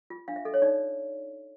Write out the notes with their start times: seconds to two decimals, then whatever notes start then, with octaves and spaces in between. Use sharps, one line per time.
0.10 F4
0.28 D4 F5
0.36 E5
0.45 A4 D#5
0.54 C#5
0.62 D#4 D5